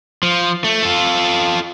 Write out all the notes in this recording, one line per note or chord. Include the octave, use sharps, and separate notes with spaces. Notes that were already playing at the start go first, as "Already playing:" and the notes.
F3
A3
F4 A4